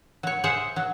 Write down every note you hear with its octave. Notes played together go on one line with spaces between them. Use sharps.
F#3 C#5
G#4 C5 C#5 E5 F#5 G#5
F#3